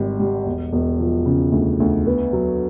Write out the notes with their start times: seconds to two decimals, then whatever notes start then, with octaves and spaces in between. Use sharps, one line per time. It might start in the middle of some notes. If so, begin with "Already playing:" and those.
Already playing: G#1 G3
0.20 G3
0.46 E1
0.72 E1
1.00 F3
1.25 C#3
1.52 D2
1.80 D2
2.07 B3
2.33 F#3